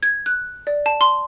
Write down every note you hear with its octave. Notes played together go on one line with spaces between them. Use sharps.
G#6
F#6
D5
A5
C6